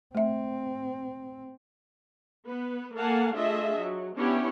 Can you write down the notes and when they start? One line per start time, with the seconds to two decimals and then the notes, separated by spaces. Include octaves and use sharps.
0.15 A3 C4 E5
2.47 B3 B4
2.94 A#3 A4 F5 F#5 G#5 A5
3.34 A3 D4 F4 G#4 D#5 E5
3.78 F#3
4.16 B3 C#4 D4 E4 G4 C#5